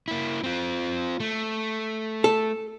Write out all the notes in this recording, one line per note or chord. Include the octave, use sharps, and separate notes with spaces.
A#3 E4
C4 F4
A3
A4